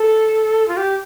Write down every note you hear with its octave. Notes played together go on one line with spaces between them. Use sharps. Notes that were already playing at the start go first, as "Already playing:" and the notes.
Already playing: A4
F4
G4